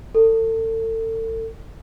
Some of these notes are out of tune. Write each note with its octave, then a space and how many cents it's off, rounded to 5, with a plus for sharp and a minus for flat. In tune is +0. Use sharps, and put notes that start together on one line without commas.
A4 +35